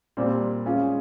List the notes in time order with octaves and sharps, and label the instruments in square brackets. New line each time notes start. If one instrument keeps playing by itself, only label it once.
[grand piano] A#2 G3 C4
G#3 C#4 F4 G#4